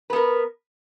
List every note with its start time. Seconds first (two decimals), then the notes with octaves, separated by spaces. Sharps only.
0.10 B4
0.13 B3
0.16 A#4